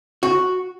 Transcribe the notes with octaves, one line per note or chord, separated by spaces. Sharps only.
F#4